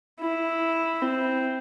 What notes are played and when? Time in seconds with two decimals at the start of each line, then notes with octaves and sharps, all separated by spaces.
0.20 E4
1.02 C4